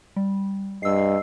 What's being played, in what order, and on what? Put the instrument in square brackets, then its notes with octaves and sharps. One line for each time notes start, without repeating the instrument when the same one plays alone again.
[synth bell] G3
[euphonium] G2 [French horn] D#5 [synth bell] E6 C7